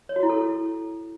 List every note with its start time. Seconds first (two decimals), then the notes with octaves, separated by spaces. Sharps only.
0.09 C#5
0.16 F#4
0.23 E4
0.29 A4